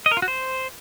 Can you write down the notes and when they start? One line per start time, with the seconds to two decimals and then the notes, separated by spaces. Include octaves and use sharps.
0.06 D#5
0.11 A#4
0.17 F4
0.22 F#4
0.28 C5